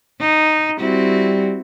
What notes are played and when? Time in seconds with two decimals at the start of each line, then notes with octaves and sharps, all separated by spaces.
0.20 D#4
0.79 G3 C4 E4 F#4